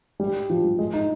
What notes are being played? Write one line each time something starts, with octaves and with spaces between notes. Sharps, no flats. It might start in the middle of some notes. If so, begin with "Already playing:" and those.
G3
F3
G3
G#3
D#4